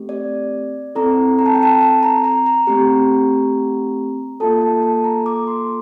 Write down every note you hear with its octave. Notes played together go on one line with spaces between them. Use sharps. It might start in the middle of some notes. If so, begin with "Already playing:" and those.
Already playing: A3 C4 G4
D5
C4 E4 A4 A#5
A#5
A5
G5
A5
A5
A#5
A#5
A#5
A3 C4 G4
A#3 F4 A4 A5
A5
A5
A#5
D6
C6